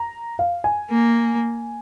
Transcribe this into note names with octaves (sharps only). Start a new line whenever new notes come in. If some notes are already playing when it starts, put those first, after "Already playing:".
Already playing: A#5
F5
G#5
A#3